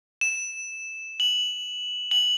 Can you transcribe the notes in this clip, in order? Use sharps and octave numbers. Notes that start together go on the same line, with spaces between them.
E7
F#7
F#7